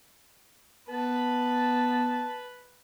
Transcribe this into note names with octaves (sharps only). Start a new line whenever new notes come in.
B3 B4 A5